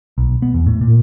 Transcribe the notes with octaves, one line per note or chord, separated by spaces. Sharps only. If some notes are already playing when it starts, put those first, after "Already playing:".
B1
B3
E2
A2
A#2